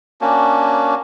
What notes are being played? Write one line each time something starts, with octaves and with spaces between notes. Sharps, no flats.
A#3 C#4 D4 F#4